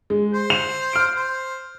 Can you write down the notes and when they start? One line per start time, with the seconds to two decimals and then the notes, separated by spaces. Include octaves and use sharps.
0.10 G#3
0.34 C5
0.50 F7
0.93 F6 D7
1.17 C5